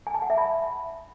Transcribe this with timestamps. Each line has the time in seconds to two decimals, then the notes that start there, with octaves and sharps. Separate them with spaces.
0.07 G#5
0.14 A5
0.22 F#5
0.30 E5
0.38 B5